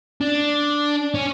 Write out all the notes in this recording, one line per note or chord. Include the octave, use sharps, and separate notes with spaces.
D4
C#4